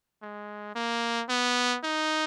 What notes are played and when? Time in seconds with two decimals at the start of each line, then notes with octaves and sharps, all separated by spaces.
0.22 G#3
0.75 A#3
1.29 B3
1.84 D#4